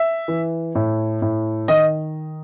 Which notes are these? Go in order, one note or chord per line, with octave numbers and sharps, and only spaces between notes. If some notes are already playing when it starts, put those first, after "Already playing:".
Already playing: E5
E3
A2
A2
D#3 D#5